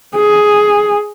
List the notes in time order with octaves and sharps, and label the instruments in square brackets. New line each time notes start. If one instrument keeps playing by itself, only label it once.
[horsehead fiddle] G#4